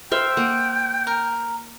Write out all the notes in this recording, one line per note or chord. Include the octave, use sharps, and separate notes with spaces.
C5 E5 F5 G5
A#3 F#5
A#4